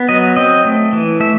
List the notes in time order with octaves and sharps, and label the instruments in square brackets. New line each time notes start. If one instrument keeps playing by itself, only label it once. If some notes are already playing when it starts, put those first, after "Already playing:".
Already playing: [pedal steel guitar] B3
F#3 D#5
C4 D#5
A3
E3
A3 E5